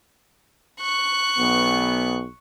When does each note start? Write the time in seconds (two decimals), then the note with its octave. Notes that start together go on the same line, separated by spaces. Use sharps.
0.80 C#6 F#6
1.38 B1 B3